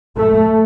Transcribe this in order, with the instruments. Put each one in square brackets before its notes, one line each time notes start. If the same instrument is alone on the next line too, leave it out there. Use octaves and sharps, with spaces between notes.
[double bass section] A3